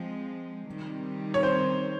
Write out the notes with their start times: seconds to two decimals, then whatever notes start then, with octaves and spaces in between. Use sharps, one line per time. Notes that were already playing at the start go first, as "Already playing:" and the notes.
Already playing: F3 G#3 C4
0.66 C3 D#3 G3 C4
1.34 C#5
1.43 C5